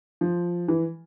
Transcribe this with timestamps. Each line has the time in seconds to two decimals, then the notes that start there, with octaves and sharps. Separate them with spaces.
0.21 F3
0.68 E3